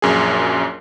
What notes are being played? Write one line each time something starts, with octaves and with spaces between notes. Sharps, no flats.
A#1 F#2 G#4